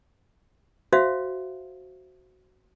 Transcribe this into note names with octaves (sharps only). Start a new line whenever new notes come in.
F#4 C5 E5 F5